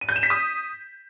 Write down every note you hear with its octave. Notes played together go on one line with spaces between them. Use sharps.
D#7
G6
E7
B6
D#6